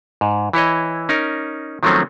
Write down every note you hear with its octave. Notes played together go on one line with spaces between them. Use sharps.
G#2
E3 E4 C#5 D#5
C#4 D#4 A#4
D#3 F3 F#3 A3 C4 C#4